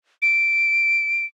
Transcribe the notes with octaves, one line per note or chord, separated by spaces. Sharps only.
D7